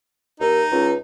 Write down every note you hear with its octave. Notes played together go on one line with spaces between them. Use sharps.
D#2 D#4
C#2